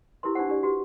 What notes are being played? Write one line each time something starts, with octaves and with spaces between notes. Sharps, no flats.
E4 G4 A#4 B4 C6
D4 D#4 F4 G4 C5 F#5
D4 G4 D5
F#4 G4 B4